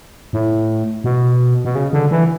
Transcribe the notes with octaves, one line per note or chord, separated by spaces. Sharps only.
A2
B2
B2
C#3
D3
E3